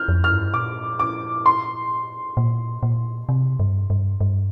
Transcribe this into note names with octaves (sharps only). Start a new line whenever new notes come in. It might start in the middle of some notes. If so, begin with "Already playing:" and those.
Already playing: F6 G6
F2
F6
G2
A#2 D6
D6
C6
A#2
A#2
C3
G2
G2
G2